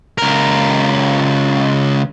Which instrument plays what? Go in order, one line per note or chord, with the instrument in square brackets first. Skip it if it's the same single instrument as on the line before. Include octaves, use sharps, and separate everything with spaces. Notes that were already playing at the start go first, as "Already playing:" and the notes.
[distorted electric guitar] C#2 A#4